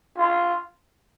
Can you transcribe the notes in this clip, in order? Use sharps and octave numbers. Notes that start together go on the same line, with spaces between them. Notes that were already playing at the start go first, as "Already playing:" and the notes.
F4